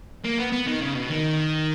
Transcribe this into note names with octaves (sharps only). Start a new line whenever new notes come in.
A#3
B3
B3
D#3
C#3
B2
D#3